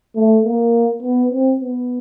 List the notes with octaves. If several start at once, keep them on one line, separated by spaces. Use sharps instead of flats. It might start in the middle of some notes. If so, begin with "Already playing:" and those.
A3
A#3
B3
C4
B3